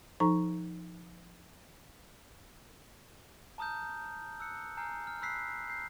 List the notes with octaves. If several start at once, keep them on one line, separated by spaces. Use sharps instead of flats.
F3 D#4 A4 A#5 C#6
A5 A#5 D#6 F6 G6
E6 F#6 C#7
G#5 A#5 F6 G6 C7
F6
B5 E6 F#6 B6 C7
G6 C7